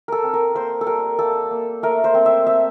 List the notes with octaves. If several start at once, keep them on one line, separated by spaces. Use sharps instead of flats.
A4 A#4
C4
A#4
A#3 C5
A4
G3 A#4
A#3 A4
A#3
A3 A#4
C5
C4
E5
C4 E5